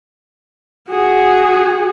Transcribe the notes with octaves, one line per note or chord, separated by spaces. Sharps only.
F#4 G#4